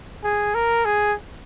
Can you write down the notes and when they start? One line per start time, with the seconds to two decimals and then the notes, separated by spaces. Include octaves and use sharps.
0.24 G#4
0.55 A#4
0.85 G#4